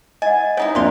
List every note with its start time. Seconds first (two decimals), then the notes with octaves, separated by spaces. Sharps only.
0.22 D#5 F#5 G#5
0.57 C3 D#4 E4 C#5
0.75 F3 G3 A#3 D4 D5 E5 F5 C6